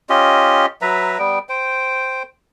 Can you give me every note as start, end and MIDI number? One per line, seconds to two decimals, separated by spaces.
0.09 0.66 61
0.09 0.66 65
0.09 0.66 67
0.09 0.66 75
0.82 1.18 54
0.82 1.18 71
0.82 1.18 76
0.82 1.18 82
1.19 1.39 55
1.19 1.39 59
1.19 1.39 79
1.49 2.23 72
1.49 2.23 79